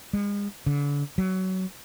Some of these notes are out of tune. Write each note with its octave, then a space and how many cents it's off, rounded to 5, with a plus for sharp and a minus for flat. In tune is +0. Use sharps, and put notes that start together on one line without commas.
G#3 -40
D3 -35
F#3 +20